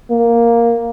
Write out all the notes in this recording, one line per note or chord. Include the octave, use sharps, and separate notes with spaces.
A#3